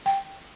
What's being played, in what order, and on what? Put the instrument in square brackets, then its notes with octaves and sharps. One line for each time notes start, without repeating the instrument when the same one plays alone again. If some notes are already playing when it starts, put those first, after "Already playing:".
[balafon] G5